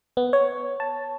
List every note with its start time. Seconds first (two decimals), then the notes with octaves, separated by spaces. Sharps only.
0.17 B3
0.33 C#5
0.80 A5